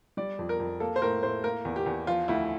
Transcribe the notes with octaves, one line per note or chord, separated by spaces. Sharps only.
G3 D5
F2
A#4
F2
A#3 A4
C5
A2 A#4
A2 C5
A#3 A#4
E2
G4
E2
F3 F4
D2 E4